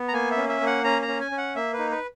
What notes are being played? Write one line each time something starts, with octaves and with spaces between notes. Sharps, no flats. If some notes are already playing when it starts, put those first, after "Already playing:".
Already playing: B3
A#5
A#3 G#5
E5
C#4
E5
A#3
F#5
C#4 A#5
A#5
C#4
G#5
C#4
F#5
A#3 E5
B4
D#4
B4